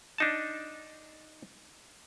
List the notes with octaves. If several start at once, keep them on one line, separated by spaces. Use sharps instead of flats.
D4 D#4 A5